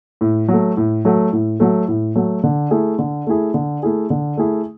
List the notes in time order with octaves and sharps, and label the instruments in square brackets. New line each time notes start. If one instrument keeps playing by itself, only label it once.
[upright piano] A2
F#3
A3
A2
F#3 A3
A2
F#3 A3
A2
F#3 A3
D3
A3 E4 G#4
D3
A3 E4 G#4
D3
A3 E4 G#4
D3
A3 E4 G#4